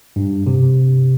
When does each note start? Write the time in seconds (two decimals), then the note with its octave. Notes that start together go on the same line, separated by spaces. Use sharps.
0.16 G2
0.47 C3